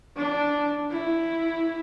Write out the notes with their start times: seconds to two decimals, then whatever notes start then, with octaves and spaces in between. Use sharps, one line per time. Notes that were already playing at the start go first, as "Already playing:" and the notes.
0.17 D4
0.91 E4